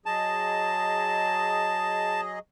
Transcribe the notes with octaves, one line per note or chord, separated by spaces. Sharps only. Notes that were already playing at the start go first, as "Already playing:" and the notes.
F#3 G#4 D#5 A5